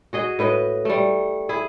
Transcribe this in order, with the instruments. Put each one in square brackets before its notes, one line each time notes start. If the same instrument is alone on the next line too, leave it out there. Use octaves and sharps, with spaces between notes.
[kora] F#4 G#4 D#5
A2 B4 D#5
G3 A3
E4 G#4